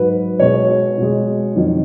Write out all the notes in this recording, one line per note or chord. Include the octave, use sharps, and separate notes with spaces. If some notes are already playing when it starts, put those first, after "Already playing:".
Already playing: G#2 F#3 B4
B2 G#3 C#5
B2 G#3
F2 D#3 F#3